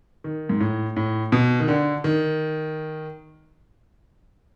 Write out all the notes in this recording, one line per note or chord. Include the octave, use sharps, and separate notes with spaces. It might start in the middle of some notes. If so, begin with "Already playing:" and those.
D#3
G#2
A2
A2
B2
D#3
D3
D#3